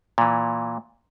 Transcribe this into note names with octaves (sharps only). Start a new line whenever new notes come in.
A#2 E3